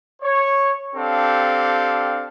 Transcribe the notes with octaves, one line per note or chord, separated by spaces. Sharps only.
C#5
C4 D4 G4 A4 F5